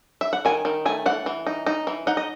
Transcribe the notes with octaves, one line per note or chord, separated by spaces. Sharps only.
E5
F#5
D#3 G#5
D#3
A3 G#5
E3 F#5
E3
D#4
D#4
E3
D#4 F#5
D#5